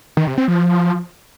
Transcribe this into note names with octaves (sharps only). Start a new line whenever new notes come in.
D#3
C3
C4
F3